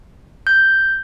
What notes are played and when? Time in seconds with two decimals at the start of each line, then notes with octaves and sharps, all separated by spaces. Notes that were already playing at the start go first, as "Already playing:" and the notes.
0.47 G6